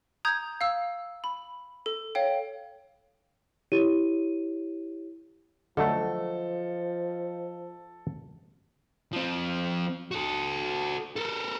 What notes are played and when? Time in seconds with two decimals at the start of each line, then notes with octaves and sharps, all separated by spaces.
0.25 A#5 D#6 G6 G#6
0.61 F5 E6
1.24 B5
1.86 A4
2.15 C#5 F5 G5
3.72 E4 G4 C#5 D#7
5.77 D3 F3 F#3 A3 A4 D#5
9.13 F3 C4
10.11 F#4 A4
11.16 A4 A#4